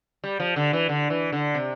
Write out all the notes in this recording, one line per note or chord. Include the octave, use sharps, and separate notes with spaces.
G3
F3
D3
E3
D3
E3
D3
C3